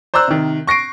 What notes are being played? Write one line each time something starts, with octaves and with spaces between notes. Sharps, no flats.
C5 D5 A#5 E6 F#6
C3 D#3
C#6 A#6 C7 D7